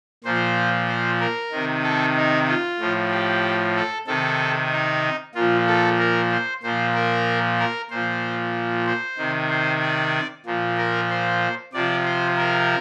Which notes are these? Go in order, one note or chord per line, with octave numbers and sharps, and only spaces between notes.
A#2 F3 C5
C5
A#4
C3 D#3
A4
D#4
F4
A2 F3
G4
A4
C3 D#3 A4
D#4
A#2 F3 F4
A4
A#4
C5
A#2 F3 C5
A#4
A#4
A#2 F3 C5
C5
C3 D#3
C5
D5
A#2 F3
A#4
C5
C3 F3 D5
C5
A#4